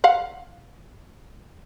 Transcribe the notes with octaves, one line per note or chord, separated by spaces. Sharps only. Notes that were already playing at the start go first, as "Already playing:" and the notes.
F5 F#5